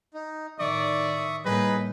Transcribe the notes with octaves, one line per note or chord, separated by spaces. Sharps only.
D#4
A2 D#3 D5 E5 C#6 D#6
A2 G3 A#3 D#4 G#4 B4 D#5